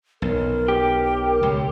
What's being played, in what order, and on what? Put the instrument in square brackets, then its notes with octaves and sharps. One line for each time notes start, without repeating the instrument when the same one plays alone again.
[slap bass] B1 [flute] A#4
[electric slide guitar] G4
[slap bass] C#2